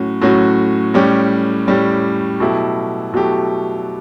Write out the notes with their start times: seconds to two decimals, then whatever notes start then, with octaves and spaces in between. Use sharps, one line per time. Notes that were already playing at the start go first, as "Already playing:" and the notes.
Already playing: A2 F#3 C#4 F#4
0.22 A2 F#3 C#4 F#4
0.94 A2 G3 C#4 G4
1.68 A2 G3 C#4 G4
2.40 B2 F#3 A3 E4 G4
3.14 B2 F#3 A3 E4 G4